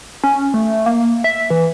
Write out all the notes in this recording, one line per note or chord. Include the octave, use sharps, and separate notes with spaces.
C#4
A3
A#3
E5
E3